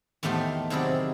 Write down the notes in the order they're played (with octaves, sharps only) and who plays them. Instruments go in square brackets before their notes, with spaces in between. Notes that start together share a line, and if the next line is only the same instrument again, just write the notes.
[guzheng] E2 A2 D#3 A3 G4 C6
C3 D#3 F#3 E4 G#4 D5